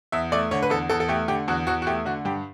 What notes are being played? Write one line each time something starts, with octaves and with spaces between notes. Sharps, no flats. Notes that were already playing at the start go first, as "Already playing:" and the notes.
E2 E5
A3 D5
D3 C#5
B4
E2 A4
E2 A4
A4
A3 G4
D3 G4
E2 F#4
E2 F#4
F#4
A3 G4
D3 F#4
G2 G4